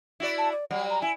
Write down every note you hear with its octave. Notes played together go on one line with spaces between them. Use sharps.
E4 F#4 D5
A5
D5
F#3 G3 F#5
A#5
E4 G#5